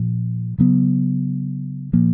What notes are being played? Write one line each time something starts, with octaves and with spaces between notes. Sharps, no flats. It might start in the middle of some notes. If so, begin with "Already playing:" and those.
Already playing: A#2 F3
C#3 F#3 B3
A#2 F3 A#3